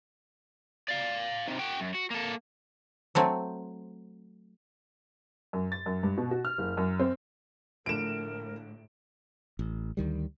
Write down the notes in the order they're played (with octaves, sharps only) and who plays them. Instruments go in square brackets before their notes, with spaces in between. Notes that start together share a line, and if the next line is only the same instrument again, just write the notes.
[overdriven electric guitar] D5 F5
C3 D#3
F#4 G5
F#2
F#4
A#3 A4
[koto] F#3 A3 C4
[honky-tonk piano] F#2
A6
F#2
G2
B2
F#4
F6
F#1
F#2
C4
[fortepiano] A#1 D3 [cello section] A2 [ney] A#4 [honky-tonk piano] D7 E7
[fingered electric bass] A1
D2 D#3 G3